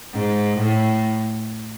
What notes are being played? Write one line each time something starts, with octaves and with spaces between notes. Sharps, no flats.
G#2
A2